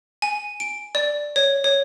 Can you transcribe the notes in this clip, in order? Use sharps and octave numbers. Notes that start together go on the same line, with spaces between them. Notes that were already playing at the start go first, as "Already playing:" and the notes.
G#5
D7
D5
C#5
C#5